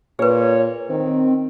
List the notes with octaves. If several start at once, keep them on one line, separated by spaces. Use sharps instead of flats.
A#2 G#4 B4 C#5
D#3 C4